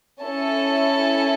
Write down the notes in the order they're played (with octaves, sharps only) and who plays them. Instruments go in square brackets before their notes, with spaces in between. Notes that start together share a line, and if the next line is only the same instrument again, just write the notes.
[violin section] C#4 E4 A4 A5